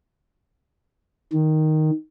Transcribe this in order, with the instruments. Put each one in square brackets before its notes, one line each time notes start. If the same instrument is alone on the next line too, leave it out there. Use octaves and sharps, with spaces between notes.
[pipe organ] D#3